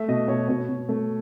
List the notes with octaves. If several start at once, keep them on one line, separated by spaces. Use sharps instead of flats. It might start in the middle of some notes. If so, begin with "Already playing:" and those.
Already playing: A3 E5
B2 D#5
B2 C#5
B2 C#5
B2
A3